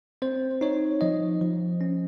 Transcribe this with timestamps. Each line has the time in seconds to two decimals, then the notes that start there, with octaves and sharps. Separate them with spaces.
0.22 C4 C5
0.61 D#4 C#5
1.01 F3 D#5
1.41 F3
1.81 C#4